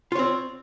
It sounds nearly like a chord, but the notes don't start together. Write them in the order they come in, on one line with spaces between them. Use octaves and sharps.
F4 C#5 C4